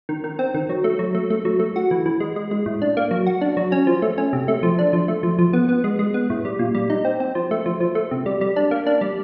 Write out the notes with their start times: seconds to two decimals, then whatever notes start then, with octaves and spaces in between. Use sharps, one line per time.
0.09 D#3
0.24 D#3
0.39 C4
0.54 D#3
0.69 F#3
0.84 A3
0.99 F#3
1.15 A3
1.30 A3
1.45 F#3
1.60 A3
1.76 F#4
1.91 E3
2.06 E3
2.20 G#3
2.36 G#3
2.51 G#3
2.66 A2
2.82 D4
2.97 A#3
3.11 F#3
3.27 F#4
3.41 D4
3.57 F#3
3.72 C#4
3.87 F3
4.02 A3
4.18 C#4
4.33 C3
4.48 A3
4.63 F3
4.79 D4
4.93 F3
5.08 A3
5.23 F3
5.39 F3
5.53 B3
5.69 B3
5.84 G#3
5.99 G#3
6.14 B3
6.30 A2
6.45 G3
6.59 A#2
6.75 G3
6.90 D#4
7.05 C4
7.20 C4
7.35 F3
7.51 A3
7.66 F3
7.81 F3
7.95 A3
8.11 C3
8.26 G3
8.41 G3
8.56 D4
8.71 A#3
8.86 D4
9.01 G3